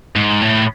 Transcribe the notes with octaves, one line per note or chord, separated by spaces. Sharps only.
G#2
A2